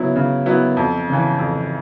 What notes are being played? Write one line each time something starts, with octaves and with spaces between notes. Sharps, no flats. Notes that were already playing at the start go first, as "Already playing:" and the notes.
Already playing: C#3 F#3 B3 E4
C#3
F#3 B3 E4
F2
C#3 E3
F2